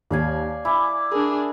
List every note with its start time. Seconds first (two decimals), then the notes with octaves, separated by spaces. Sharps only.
0.11 D#2 D5 F5 G#5
0.65 E4 G#5 D6
1.12 D4 G#4 A#4